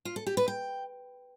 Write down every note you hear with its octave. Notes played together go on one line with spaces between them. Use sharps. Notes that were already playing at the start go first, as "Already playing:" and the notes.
F4
A4
G4
B4
G5